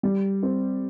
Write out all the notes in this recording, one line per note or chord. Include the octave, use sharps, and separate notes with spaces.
G3
C4